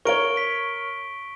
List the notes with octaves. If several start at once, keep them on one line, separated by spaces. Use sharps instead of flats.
A#4 C#5 C#6 D7 G7
B6